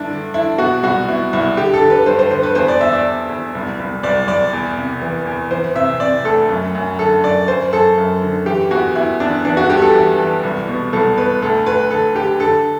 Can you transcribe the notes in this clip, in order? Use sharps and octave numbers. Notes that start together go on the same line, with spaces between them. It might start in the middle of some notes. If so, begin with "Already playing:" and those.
Already playing: G2 D3 D4 E4
D3
D3 E4
B2 F#4
C2 F#4
B2 E4
C2 E4
D3 G4
A4
D3
B4
G2 C5
C5
D3 C5
B4
E2 C5
D5
E2 E5
D5
E2
E2
C2
C2
C2 D5
C2 D5
E2
C3
E3
E2
E3 C5
C3 E5
C3 D5
D2 A4
F#2
F#2
D3 A4
F#2 D5
F#2 C5
F#2 A4
F#2
D3
E3 G4
E2 F#4
E2 E4
E2 D4
E3 D4
F#4
G2 G4
A4
E3
E3
C2
B2
C2 A4
B2 B4
D2 A4
D2 B4
D3 A4
D3 G4
D3 A4